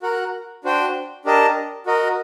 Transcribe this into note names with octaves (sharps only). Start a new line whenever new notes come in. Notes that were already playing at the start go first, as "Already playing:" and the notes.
F#4 A#4 F#5
D4 F#4 C5 G5
D4 G4 A#4 D#5 A5
F#4 A#4 D#5